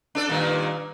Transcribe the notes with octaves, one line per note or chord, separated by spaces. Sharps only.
D4 A4 D5
G2 A#2 D#3